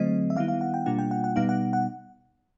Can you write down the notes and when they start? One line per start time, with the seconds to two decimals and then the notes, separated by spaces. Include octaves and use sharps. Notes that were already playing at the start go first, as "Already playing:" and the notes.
Already playing: D3 F#3 A3 C4 D#5
0.30 E5
0.36 D#3 G3 B3 E4 F5
0.48 F5
0.61 F#5
0.74 G5
0.86 B2 G3 A#3 D4 F4 F#5
0.99 G5
1.11 F#5
1.24 F#5
1.36 B2 G3 B3 D#4 F5
1.49 F#5
1.73 F#5